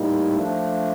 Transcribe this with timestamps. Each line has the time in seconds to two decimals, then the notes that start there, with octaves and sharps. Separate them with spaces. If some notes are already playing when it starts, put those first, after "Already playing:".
Already playing: A2 G3 A#3 D#4
0.34 F3 A3 D4